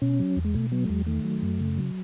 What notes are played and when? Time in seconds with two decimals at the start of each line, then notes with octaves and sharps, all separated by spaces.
0.02 B2 C#4
0.20 F#3
0.37 E2
0.45 G#3
0.54 B2 A3
0.72 F#3 B3
0.85 A3
0.89 E2 G#3
1.07 D#3 A3
1.24 F#3
1.42 F#2
1.60 C#3
1.77 F#3